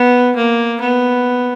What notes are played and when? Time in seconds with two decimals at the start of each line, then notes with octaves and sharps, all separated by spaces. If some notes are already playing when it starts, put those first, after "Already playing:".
Already playing: B3
0.36 A#3
0.81 B3